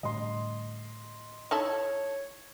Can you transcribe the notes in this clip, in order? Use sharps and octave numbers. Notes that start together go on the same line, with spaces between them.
A2 D3 G3 D#5 C6
D#4 E4 A4 C#5